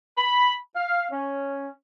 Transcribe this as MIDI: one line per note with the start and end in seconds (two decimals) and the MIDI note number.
0.18 0.53 83
0.75 1.06 77
1.12 1.69 61